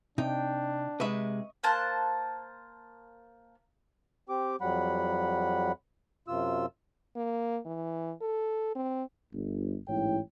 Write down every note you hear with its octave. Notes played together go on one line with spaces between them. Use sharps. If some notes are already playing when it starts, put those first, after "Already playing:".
C3 D4 D#4 G5
C3 G#3 B4 D#5 E5 C#6
A#3 C5 A5 F#6
C4 G4 D6
F2 F#3 G3 F#5 B5
F#2 C3 F4 E6
A#3
E3
A4
C4
G1
A1 G#2 E4 C#5 G5